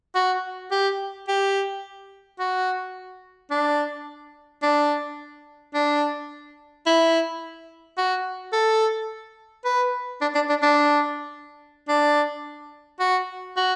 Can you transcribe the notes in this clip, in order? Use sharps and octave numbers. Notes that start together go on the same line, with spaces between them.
F#4
G4
G4
F#4
D4
D4
D4
E4
F#4
A4
B4
D4
D4
D4
D4
D4
F#4
F#4